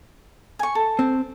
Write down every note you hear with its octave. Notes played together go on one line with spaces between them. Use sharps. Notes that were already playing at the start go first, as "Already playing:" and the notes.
G#5 C#6
A4
C4